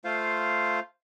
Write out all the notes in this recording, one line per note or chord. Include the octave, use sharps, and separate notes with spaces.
A3 F4 C5 F5